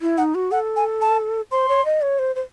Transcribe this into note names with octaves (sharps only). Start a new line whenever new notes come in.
E4
D#4 F#5
F#4
A4 F#5
G#5
A5
C5 C6
C#5
D#5
C#5
C5
C5